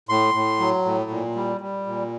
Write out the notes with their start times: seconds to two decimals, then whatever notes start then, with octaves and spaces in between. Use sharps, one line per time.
0.09 A2 C6
0.34 A2
0.60 F#3
0.85 A2
1.11 A#2
1.36 G3
1.61 G3
1.87 A#2